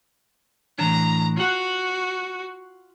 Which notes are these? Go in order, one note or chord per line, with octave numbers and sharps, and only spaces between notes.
A2 E3 D4 A#5
F4 F#4 F#5